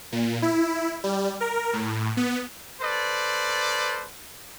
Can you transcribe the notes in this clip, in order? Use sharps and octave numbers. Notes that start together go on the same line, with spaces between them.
A#2
E4
G3
A#4
A2
B3
A4 B4 C5 D5